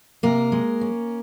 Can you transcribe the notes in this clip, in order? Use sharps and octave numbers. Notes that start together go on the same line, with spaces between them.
C3 A#3 A#4
G#3
C#4